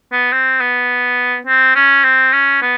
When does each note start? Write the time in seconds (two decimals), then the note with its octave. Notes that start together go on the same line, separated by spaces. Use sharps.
0.12 B3
0.32 C4
0.60 B3
1.47 C4
1.75 C#4
2.04 C4
2.33 C#4
2.62 B3